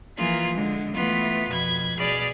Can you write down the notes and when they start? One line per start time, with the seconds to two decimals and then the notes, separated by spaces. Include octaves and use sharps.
0.17 E3 F3 A#3 F4 G#4
0.53 D3 G#3
0.94 E3 A3 B3 F4
1.49 F2 B2 B5 G#6
1.98 B2 G#4 D5 B5 F6